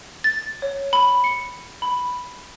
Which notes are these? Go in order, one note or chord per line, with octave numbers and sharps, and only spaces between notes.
A6
C#5
B5
C#7
B5